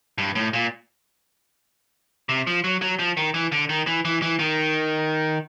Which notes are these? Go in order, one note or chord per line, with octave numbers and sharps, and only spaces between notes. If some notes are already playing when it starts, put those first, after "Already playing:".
G2
A2
A#2
C3
F3
F#3
F#3
F3
D#3
E3
D3
D#3
E3
E3
E3
D#3